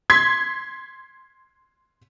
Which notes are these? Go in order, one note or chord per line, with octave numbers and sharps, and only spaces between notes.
C6 G#6 B6